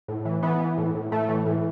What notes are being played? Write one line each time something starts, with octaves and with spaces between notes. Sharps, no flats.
A2
E3
E3 B3
E3
A2
A2
A2 A3
E3
A2